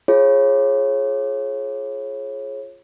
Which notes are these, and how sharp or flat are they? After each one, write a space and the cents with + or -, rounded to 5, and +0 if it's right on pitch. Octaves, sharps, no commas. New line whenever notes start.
F4 +0 G#4 +15 C#5 -30